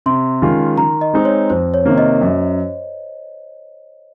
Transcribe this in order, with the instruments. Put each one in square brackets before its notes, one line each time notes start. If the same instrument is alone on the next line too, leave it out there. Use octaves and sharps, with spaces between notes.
[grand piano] C3 [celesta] C6
[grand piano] D#3 G#3 C#4 F4
[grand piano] D#3 [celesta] A#5
[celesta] D#5
[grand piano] G#3 C4 D#4
[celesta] C#5
[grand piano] F2 [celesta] C5
[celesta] C#5
[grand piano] C3 D#3 A#3
[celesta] D#5
[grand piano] F#2